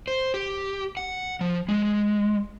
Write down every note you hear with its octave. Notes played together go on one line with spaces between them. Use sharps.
C5
G4
F#5
F3
G#3